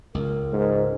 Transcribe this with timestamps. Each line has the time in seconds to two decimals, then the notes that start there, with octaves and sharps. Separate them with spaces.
0.15 C#2 A#4
0.53 G#2